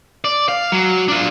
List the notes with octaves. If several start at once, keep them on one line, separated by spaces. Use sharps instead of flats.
D5
F5
F#3
D4 F4